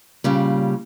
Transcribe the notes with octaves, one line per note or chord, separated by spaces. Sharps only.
A#2 C#3 G3